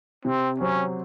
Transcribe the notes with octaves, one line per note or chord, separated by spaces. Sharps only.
C3 C4
F#3 C4 C#4